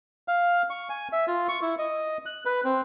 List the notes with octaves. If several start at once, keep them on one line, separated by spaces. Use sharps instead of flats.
F5
C#6
G#5
E5
F4
C#6
E4
D#5
F#6
B4
C4